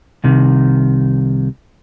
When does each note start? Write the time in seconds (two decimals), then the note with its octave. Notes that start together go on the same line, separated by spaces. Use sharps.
0.24 C2 C3 D#3